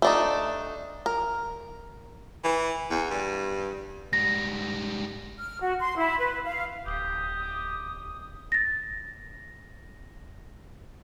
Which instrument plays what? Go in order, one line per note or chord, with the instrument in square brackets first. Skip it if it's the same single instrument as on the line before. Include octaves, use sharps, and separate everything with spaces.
[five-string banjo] A3 D4 D#4
A#4
[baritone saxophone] E3
E2
G2
[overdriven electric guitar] G#2 G3 [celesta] A#6
[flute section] F6
F#4
C6
E4
B4
F5
[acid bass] D1 [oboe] G4 [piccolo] D#6
[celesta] A6 A#6